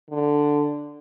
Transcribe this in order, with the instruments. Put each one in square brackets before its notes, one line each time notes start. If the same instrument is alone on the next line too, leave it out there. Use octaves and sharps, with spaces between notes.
[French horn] D3